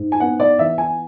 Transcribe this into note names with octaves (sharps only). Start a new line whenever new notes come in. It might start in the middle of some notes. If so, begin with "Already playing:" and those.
Already playing: G#2
G#5
B3 F#5
D5
E3 E5
G#5